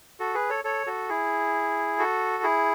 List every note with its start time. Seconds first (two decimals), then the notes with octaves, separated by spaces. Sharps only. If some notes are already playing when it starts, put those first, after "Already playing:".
0.20 F#4 A4
0.34 G#4 B4
0.50 A4 C#5
0.64 A4 C#5
0.87 F#4 A4
1.09 E4 G#4
1.99 F#4 A4
2.43 E4 G#4